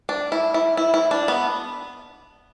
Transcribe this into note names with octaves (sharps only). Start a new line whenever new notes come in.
D4
E4
E4
E4
E4
D4
B3